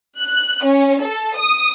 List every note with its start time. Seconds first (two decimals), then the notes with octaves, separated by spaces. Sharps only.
0.19 F#6
0.64 C#4
1.01 A4
1.37 D#6